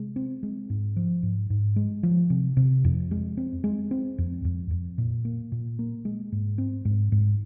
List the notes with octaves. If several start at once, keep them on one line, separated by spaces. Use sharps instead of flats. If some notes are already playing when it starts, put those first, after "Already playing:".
Already playing: C3 G#3
C4
G#3
G#2
F3
G#2
G#2
G#3
F3
C3
C3
F2
G#3
C4
G#3
C4
F2
F2
F2
A#2
A#3
A#2
A#3
G#3
G#2
C4
G#2
G#2